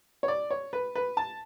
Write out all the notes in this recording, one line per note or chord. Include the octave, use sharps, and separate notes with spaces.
C#5
D5
C#5
B4
B4
A5